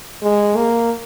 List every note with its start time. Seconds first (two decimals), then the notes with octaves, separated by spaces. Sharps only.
0.23 G#3
0.57 A#3